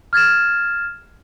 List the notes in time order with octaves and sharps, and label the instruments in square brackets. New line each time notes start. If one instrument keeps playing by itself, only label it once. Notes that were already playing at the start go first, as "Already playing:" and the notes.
[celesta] F6 G#6 A6 E7